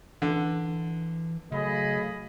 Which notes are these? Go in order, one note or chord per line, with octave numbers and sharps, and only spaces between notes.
D3 E3
C#3 F#3 A3 G#4 D#5 F5 B5